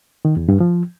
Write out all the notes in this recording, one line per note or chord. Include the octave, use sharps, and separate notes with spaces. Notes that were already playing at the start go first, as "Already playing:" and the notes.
D#3
E2
G2
F3